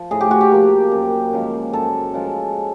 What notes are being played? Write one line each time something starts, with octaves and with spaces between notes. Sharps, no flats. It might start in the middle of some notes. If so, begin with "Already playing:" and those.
Already playing: F3
A2 G#4
G4
F#4
G4
F3 A#3
F#2
C#3 F3 G#3
F#2 A4
C#3 F3 G#3